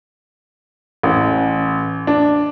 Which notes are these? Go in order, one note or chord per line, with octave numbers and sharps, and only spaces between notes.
A1
D4